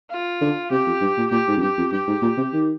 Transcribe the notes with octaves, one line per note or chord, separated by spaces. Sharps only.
F4
D3
C3 G4
F2
G2
A#2
A#2 G4
G#2
F2
G2 G4
F2
G2 G4
G#2
A#2
C3
D#3